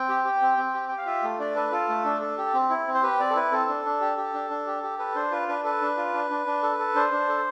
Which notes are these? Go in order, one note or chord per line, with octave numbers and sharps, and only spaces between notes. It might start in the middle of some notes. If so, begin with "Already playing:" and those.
Already playing: C4 G5
G4
G4
C4
C4
G4
G4 G5
F5
F4 E5
A3
D4 D5
A4 B4
F4 A4
A3
D4
A4
G4
C4
E4
C4
C5
G4 B4
C4 D5
A4
E4 B4
C4 A4
D4
D4
G4
G4
D4
D4
G4
G4
A4 B4
D4 C5
F4 B4
D4 B4
A4 B4
D4
F4
D4
D4
D4
A4
A4
D4 C5
D4
A4